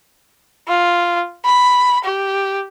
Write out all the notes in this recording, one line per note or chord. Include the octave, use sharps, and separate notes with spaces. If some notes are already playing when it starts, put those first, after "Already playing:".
F4
B5
G4